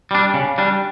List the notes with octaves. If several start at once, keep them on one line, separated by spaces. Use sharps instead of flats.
G3 D4
C#3
G3 D4